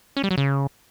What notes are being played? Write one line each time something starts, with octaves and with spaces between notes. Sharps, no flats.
C#4
G3
F#3
C#3